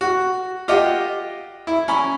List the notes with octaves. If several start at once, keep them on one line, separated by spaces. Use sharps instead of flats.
F#4
F4 G4 D#5 F#5
E4
C#4 G#5 B5